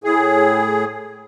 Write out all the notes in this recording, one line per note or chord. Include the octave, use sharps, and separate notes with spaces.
A2 G#4